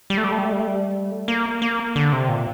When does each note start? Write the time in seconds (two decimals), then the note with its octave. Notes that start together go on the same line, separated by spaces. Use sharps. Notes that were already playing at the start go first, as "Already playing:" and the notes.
0.10 G3
0.18 A3
0.24 G3
0.32 A3
0.38 G3
0.45 A3
0.52 G3
0.59 A3
0.67 G3
1.12 A3
1.28 A#3
1.62 A#3
1.96 D3
2.13 C3
2.29 A#2